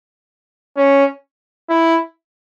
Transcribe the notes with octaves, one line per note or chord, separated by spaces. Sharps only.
C#4
E4